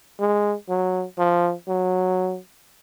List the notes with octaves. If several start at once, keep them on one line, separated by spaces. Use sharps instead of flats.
G#3
F#3
F3
F#3